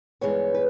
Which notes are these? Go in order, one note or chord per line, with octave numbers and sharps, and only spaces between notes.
G2 E3 G#3 B3 C#5
B4